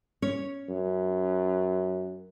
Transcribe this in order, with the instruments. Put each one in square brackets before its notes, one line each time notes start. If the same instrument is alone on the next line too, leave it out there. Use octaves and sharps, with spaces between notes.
[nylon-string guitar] C#4 C#5
[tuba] F#2